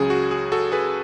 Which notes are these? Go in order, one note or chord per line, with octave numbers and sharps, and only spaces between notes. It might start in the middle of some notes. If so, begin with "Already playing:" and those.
Already playing: C#2 C#3 F#3 C#4 G#4
F#4
G#4
F#4 A4
G#4 B4